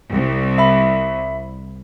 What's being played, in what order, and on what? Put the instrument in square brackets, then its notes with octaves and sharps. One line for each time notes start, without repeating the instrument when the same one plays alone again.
[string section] C2
[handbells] E5 B5